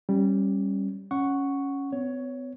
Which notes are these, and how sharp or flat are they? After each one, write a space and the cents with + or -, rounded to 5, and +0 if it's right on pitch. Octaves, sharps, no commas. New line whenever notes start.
G3 +0 C#4 -20
C#4 +0 F#5 +0 C#6 +0
B3 +45 C#5 +15